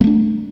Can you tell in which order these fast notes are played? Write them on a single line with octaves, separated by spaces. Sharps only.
A#3 A3 D4